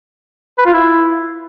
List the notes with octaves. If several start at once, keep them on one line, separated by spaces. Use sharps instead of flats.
B4
F4
E4